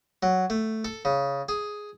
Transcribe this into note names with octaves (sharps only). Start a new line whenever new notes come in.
F#3
A3
A4
C#3
G#4